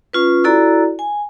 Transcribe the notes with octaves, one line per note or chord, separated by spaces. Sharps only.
C#4 F4 B4
E4 F#4 A4 D5 A#5
G#5